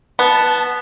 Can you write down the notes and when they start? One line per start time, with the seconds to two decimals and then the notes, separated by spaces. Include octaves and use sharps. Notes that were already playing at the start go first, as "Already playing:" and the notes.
0.19 B3 A5